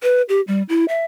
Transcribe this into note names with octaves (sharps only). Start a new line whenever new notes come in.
B4
G4
G3
E4
E5